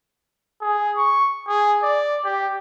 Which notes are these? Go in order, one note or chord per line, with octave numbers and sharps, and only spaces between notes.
G#4
C#6
G#4
D5
G4